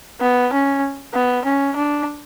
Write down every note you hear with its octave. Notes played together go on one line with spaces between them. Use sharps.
B3
C#4
B3
C#4
D4